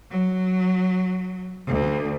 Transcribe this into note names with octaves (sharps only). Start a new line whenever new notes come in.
F#3
D2